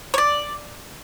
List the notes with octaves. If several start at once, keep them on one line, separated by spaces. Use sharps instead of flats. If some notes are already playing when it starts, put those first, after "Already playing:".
C#5
D5